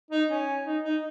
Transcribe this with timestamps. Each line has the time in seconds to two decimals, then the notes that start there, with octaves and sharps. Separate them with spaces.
0.11 D#4
0.29 C#4
0.65 D#4
0.84 D#4